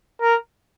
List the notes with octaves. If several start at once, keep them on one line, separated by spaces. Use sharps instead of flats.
A#4